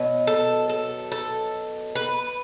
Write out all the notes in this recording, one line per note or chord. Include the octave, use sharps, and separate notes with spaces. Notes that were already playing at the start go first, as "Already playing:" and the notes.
Already playing: B2 F#3 B3
A4
A4
A4
B4